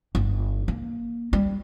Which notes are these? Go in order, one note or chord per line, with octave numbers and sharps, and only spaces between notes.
G1
A#3
G3